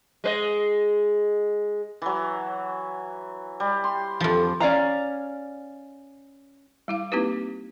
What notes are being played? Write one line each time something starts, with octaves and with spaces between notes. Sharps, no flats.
G#3 B4 D#5
E3 F#3
G3
C6
F2 F3
C#4 D5 F5 A#5
G3 E4 F5
A#3 C4 D#4 E4 G4 B4